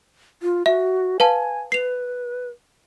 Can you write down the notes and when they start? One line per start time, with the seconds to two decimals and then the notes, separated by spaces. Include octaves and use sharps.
0.42 F4
0.66 F#4 E5
1.20 B4 F5 G#5 A5
1.72 B4 C7 F7